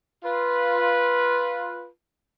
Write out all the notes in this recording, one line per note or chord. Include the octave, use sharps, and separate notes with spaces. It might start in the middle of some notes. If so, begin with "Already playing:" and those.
F4 B4